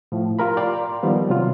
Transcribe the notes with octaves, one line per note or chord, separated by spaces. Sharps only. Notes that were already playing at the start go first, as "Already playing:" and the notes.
A2 F3
F4 G4 A#4 B5
D5 F5 G5 A#5 C6
D#3 F3 G3 B3
C3 F#3 F4